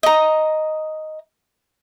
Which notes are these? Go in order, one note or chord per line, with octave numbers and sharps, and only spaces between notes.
D#5 A#5